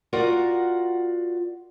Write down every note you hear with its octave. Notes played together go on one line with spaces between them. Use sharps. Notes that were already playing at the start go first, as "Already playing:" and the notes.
F4 F#4 A#4 D5 F#5